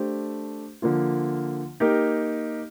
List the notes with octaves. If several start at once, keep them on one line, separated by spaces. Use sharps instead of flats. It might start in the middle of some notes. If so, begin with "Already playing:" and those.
Already playing: A3 D4 G4 C5
D3 F3 A#3 F4
A#3 D#4 G4 A#4